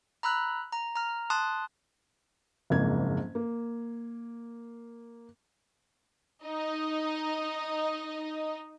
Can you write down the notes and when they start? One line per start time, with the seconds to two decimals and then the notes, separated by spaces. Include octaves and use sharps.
0.23 A#5 B5 E6 F#6
0.72 A#5
0.95 A#5 F6
1.30 A5 C6 D#6 F#6
2.70 F#1 F2 G#2 A#3 G#6
3.35 A#3
6.43 D#4 D#5